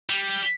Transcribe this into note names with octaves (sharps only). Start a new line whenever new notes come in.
G3